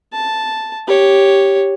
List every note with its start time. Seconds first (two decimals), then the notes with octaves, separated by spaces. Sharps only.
0.13 A5
0.87 G4 C#5